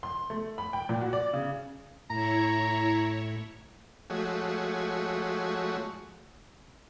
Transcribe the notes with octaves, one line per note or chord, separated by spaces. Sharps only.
C6
A3
B5
G5
A#2
F#4
D5
C#3
A2 E4 C#5 A#5
F3 G#3 A3 F#4 C#5